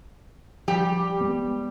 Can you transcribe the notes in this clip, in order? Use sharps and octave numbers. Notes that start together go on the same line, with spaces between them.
F3 G3 G4
G#3 B3